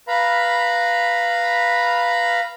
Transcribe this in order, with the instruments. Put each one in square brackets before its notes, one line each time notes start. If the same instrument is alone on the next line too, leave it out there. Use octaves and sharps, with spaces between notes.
[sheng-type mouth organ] B4 F5 A#5 B5